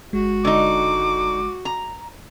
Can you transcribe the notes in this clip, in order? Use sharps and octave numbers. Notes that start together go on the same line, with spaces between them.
G1 G#3 F#4
D3 D#4 D6
A#5